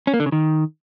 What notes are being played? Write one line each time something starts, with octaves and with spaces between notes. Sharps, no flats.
C#4
A#3
D3
C#3
D#3